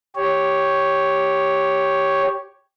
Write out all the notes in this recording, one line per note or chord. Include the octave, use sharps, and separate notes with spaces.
G4 C#5